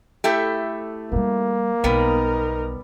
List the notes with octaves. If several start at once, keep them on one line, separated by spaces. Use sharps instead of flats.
A3 E4 G4
F3 G3 A#3
B1 G3 B3 D#4 A#4